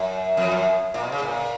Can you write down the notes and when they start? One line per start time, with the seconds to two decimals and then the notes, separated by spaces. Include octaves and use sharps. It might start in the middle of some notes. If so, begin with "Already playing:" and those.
Already playing: F#2
0.37 F2
0.52 F#2
0.94 A#2
1.04 B2
1.12 C#3
1.22 A#2